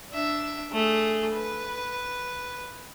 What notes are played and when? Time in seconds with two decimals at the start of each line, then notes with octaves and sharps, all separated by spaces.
0.12 D4 E5
0.72 A3 G#4
1.32 B4